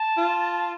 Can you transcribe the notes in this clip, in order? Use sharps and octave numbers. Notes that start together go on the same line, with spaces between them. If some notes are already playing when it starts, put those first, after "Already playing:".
Already playing: A5
F4